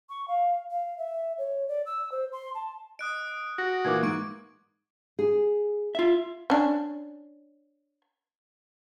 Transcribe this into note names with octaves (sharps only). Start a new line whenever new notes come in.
C#6
F5
F5
E5
C#5
D5
E6
C5
C6
A5
D#5 D#6 F#6 D7
F#4 A#6
A#2 E3 A#3 D6 G#6
G#2 C#6 D7
G#4
F4 E5
C#4 D4